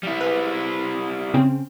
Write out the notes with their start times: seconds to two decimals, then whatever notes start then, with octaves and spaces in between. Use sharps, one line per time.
0.03 G3 E4
0.21 G#4 B4
1.34 C#3 C4 C#4